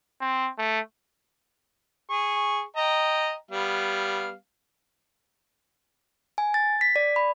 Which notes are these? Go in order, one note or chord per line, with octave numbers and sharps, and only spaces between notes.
C4
A3
G#4 C#6
D#5 G5 A#5
G3 B3 F5
G#5
A6
B6
D5
B5